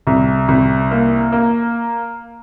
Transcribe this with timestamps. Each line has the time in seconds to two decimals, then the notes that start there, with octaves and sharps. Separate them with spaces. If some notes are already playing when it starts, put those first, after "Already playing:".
0.07 C2
0.48 C2
0.91 A#3
1.32 A#3